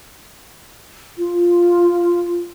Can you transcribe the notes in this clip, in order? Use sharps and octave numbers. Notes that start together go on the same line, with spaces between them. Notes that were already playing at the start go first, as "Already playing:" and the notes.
F4